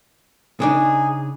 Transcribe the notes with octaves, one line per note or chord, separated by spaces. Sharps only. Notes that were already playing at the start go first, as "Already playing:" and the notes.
C#3 D4 D#4 G#4